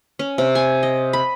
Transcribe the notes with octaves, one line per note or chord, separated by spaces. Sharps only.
C#4
C3
G#5
D#5
B5